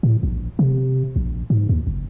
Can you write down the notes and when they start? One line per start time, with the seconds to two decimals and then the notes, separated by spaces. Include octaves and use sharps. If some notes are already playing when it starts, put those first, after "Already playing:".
0.03 A2
0.23 A#1
0.59 C3
1.16 A#1
1.50 G#2
1.69 D#2
1.87 F#1